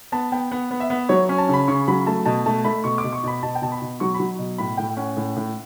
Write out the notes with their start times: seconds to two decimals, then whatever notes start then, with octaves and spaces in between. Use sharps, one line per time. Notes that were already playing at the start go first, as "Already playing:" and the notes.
0.12 B3 A5
0.32 B3 G5
0.51 B3 F#5
0.71 B3
0.80 E5
0.90 B3
1.09 F#3 C#5
1.29 C#4
1.38 A5
1.48 C#3
1.53 B5
1.68 C#3 C#6
1.88 F#3 B5
2.07 A3 A5
2.26 B2 A5
2.46 A3 A5
2.64 A3 B5
2.84 B2 C#6
2.98 D6
3.04 B2
3.13 C#6
3.24 B2 B5
3.43 B2 A5
3.55 G5
3.62 B2 A5
3.72 B5
3.82 B2
4.00 F#3 C#6
4.14 B5
4.20 F#3
4.39 B2
4.58 A2 B5
4.77 A2 G5
4.97 C#4 F#5
5.17 A2
5.36 A2